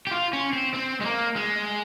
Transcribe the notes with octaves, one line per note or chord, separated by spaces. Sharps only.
G4
F4
C#4
C4
C4
G#3
A#3
G#3